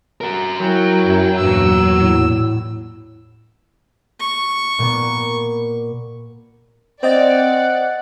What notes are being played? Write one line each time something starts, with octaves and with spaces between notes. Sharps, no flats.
F#4 A#4
F#3 E4 A#4 G5
F#2
E2 G2 A#2 E6
A2
C#6
A#2 A#3 B3
C4 C5 D5 D#5 F#5 A6